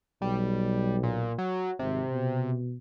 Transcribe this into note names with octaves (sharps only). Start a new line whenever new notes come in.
B1 G3
A#2
F#3
G#1 C3
B2